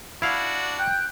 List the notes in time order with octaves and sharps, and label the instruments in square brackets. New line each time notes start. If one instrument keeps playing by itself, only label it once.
[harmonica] D4 F#4 [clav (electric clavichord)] E4 F5
[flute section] G5 F#6 G6